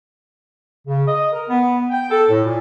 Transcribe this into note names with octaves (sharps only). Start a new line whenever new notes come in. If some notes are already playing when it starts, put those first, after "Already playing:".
C#3
D#5
A#4
B3
G5
A4
A2
A#2